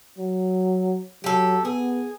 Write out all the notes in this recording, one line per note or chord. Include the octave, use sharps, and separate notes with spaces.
F#3
F#3 G4 A4
B3 G#4